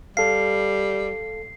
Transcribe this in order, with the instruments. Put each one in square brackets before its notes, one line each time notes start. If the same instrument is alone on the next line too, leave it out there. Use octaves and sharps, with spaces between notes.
[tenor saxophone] G3 [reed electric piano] A4 F5 [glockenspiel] C7